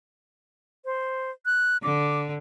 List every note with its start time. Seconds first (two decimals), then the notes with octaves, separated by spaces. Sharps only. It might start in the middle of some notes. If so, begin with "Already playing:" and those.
0.85 C5
1.46 F#6
1.83 D3 D6